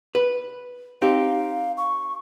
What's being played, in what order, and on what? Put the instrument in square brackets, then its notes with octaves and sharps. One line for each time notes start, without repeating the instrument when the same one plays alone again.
[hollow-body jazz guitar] B4
[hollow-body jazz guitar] C4 D#4 G4 [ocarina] F5
[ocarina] C#6